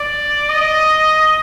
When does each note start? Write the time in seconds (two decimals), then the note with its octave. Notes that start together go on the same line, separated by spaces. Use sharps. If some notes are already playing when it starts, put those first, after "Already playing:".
Already playing: D5
0.49 D#5